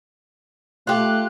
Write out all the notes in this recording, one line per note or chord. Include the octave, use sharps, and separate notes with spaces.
A3 F4 G4 F#6